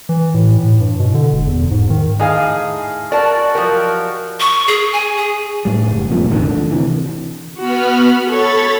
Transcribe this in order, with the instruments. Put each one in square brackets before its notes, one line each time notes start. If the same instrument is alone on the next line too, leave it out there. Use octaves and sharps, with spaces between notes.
[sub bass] E3
A2
A2
G2
B2
D3
E1
E2
G#2
D#3
[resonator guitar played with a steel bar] A2 [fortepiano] D#4 G#4 F5
[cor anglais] F#4 [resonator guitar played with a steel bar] A#4 A5 [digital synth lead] D5
[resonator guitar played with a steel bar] F3 F#3 G4 [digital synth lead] A#4
[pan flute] C#6
G#4
G#5
G#4
[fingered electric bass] A2 G3
F#1
E1 F2 A#2
A1 D2 B2 D#3
D3
C3 E3
[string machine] B3 B5 F6 [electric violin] F#4
[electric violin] A4 C#5 [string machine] B5 A6